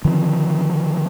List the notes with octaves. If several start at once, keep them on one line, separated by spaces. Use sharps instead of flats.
D3 D#3 F3 C4